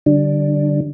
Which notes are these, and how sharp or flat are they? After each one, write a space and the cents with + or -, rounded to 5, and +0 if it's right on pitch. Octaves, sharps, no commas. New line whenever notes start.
D3 +0 G3 -15 D4 +5